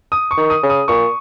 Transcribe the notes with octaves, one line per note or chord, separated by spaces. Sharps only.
D#6
C#6
D#3
D#6
C#3
D#6
A#2 C#6